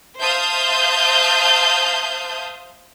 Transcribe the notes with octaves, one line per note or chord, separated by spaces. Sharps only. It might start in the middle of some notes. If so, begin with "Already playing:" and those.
C5 E5 F5 A5 D#6 G6